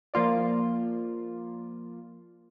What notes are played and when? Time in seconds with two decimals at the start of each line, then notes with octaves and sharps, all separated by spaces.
0.14 F3 A#3 F4 D5